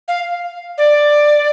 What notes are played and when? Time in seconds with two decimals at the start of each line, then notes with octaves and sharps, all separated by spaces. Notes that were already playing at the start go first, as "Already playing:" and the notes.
0.08 F5
0.78 D5